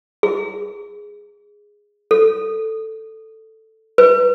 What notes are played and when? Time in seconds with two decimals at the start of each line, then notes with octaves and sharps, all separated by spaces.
0.23 G#4
2.11 A4
3.98 B4